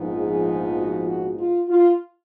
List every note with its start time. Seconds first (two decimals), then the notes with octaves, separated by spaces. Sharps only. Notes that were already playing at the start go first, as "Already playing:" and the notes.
Already playing: A#1 G#2 F3 B3 D#4
0.14 G#4
0.76 F#4
1.06 F#4
1.38 F4
1.68 F4